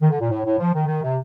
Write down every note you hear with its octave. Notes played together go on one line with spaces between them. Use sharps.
D#3
D3
A#2
A2
A2
F3
D#3
D#3
C3